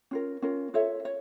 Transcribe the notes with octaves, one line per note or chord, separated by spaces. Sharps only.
C#4 F4 A#4
C#4 F4 A#4
F4 A4 C#5 E5
C#5